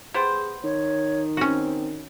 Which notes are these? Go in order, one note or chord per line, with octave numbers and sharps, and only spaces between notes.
B3 G4 G#4 C5
D#3 C#5
C4 C#4 F#4